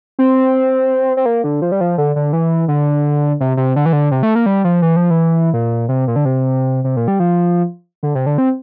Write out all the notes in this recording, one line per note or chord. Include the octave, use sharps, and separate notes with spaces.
C4
C4
A#3
D3
F3
G3
F3
D3
D3
E3
D3
C3
C3
D3
E3
D3
C3
A3
A#3
G3
F3
E3
F3
E3
A#2
C3
A#2
D3
C3
C3
A#2
G3
F3
D3
C3
D3
C4